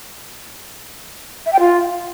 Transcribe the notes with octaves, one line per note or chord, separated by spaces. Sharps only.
E5
G5
F4